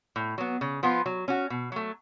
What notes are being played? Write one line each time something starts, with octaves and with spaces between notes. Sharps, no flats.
A2
F#3 B3
C#3
F3 B3 F4
F#3
C#4 F#4
B2
F#3 A3